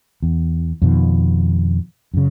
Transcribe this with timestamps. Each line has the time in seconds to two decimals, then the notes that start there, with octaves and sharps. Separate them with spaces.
0.22 E2
0.82 F2 B2 D#3
2.14 F#2 C#3